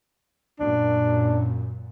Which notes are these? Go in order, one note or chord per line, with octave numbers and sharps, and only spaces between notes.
F#2 A#2 D4